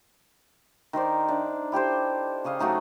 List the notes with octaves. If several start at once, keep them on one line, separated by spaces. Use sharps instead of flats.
D#3 A#4 C5 D5
D4 D5 E5
E4 G4 A4 C5
C#3 C#5 D#5 F5
F#3 A3 D#4 G#4